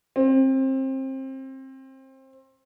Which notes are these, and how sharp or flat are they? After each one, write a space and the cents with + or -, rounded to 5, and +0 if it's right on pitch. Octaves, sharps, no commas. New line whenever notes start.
C4 +25